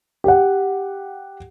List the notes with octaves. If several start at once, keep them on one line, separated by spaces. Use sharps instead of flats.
G4 F#5